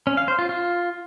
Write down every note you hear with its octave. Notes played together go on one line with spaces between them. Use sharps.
C#4
F5
C5
F4
F4